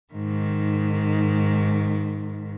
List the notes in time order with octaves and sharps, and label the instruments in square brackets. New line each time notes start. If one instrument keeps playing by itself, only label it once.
[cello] G#2 D#3